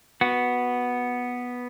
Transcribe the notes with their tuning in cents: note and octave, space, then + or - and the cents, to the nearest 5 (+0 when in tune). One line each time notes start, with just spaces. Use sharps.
B3 -5 F#4 +0